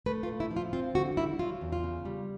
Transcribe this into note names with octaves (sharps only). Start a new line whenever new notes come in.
A3 B4
F4
A#2
E4
F3
F4
C4 F4
D3 F#4
G3 E4
F#3 F4
E2
F4
C#3
G3